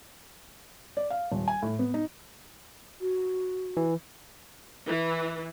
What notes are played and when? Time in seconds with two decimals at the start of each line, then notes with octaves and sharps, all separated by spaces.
0.97 D5
1.10 F5
1.32 D#1
1.48 G#5
1.62 A2
1.79 B3
1.94 D#4
3.01 F#4
3.77 E3
4.86 E3